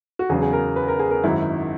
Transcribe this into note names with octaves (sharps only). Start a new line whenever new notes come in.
F#4
E2 C#3 F#3 G#4
G#4
A#4
B4
A#4
G#4
A#4
G#1 F#2 D#3 E4